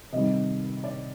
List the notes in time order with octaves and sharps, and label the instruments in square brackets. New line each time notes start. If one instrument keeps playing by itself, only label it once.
[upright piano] C3 D#3 G3 D#5
D5